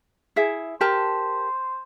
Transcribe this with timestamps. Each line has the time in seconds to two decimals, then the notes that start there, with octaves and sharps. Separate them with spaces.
0.36 E4 G#4 E5
0.81 G4 A#4 C5 A5